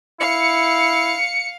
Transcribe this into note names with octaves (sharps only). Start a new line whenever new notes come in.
E4 F5 C#7